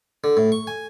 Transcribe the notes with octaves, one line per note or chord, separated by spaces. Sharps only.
D3
A2
C#6
G#5